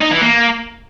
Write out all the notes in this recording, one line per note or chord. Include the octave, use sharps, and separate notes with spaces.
D#4
E3
A#3